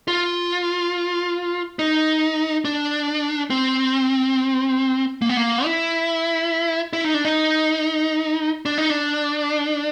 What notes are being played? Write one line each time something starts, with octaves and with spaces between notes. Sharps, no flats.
F4
D#4
D4
C4
A#3
B3
A#3
E4
E4
D#4
D4
D#4
D4
D#4
D4